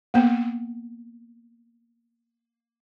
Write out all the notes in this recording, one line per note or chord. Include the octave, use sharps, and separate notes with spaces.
A#3 B3